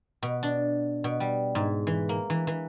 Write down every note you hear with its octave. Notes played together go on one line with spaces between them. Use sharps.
B2
D4
B2
G3
G#2
E3
A#3
E3
E3